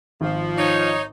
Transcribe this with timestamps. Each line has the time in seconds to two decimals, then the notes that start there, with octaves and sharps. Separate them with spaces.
0.21 G#1 F3
0.58 D#4 C#5